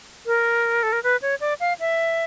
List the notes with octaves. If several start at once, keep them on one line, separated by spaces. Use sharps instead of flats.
A#4
A4
A#4
B4
C#5
D5
F5
E5